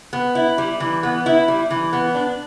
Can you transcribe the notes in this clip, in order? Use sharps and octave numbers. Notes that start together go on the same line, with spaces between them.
B3
E4
G3
E3
B3
E4
G3
E3
B3
D4